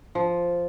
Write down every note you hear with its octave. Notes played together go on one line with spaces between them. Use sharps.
F3